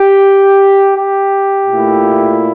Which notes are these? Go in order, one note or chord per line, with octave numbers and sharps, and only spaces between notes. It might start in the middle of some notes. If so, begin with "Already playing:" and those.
Already playing: G4
G4
A#2 A3 E4